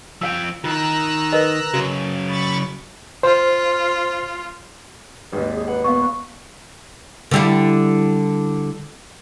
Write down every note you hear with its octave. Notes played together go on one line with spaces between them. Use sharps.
F3 F5 G5 E6
D#3 F4 A#5 E6 F#6
A#4 B4 D#5
C#3 F#3 F#4
B5 C#6 A6
F4 C5
G#1 D#2 B4
G#4
B4 F#5
A#2 B3 F5 C#6
D3 G3 E4